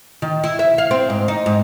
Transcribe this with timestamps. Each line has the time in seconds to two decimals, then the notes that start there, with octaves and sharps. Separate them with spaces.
0.22 D#3
0.44 E4
0.59 E5
0.78 F5
0.91 C4
1.10 G#2
1.28 D#4
1.46 G#2